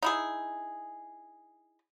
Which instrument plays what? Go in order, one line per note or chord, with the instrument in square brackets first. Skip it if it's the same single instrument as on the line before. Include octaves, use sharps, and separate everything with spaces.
[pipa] D#4 E4 G#4